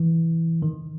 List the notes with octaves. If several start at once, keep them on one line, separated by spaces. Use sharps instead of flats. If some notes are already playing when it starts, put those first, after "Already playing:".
Already playing: E3
D#3